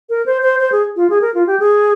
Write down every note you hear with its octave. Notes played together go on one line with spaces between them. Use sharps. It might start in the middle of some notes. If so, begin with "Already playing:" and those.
A#4
C5
C5
C5
G#4
F4
G#4
A#4
F4
G4
G#4